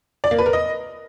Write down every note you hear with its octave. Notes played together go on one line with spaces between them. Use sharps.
D5
A#3
B4
A#4
D#5